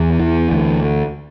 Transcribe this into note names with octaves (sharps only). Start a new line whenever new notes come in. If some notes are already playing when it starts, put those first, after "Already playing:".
Already playing: E2
E3
D2